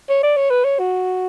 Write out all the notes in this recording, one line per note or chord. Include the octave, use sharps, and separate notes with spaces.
C#5
D5
C#5
B4
C#5
F#4